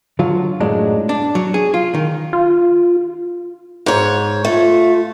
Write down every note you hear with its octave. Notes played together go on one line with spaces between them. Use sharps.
D3 F#3 F4
F#2 A2 F#3 G#3 D4 D#4
D4
F#3
G#4
F4
D#3
F4
G#2 C#5
A3 F4